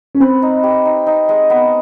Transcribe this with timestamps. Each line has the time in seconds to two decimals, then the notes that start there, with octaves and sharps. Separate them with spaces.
0.15 C#4
0.20 C4 B4
0.42 D#4
0.63 G4
0.85 D#4
1.07 D#4
1.29 G#3
1.50 B3